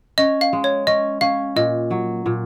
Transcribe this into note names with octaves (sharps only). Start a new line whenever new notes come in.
C#4 D#5
F5
G#3
C#5
C#4 D#5
C#4 F5
A#2 D#5
F#3
A#2